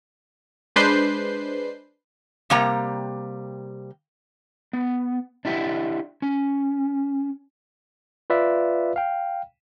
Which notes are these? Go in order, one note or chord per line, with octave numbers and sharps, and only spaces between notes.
G#3 D4 B4 C5 G6 C7
C3 G3 A#3 G5 A#5
B3
D4 E4 G4 E5 F#5
C#4
F4 B4 D5 E5 F5
F5 G5